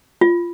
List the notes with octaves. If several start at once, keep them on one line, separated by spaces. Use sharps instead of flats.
F4